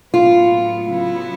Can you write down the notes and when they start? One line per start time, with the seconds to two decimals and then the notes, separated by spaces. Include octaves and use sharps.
0.14 A2 F#3 B3 F4
0.89 C#3 F#3 B3 E4